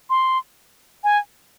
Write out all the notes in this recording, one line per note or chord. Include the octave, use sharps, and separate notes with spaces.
C6
G#5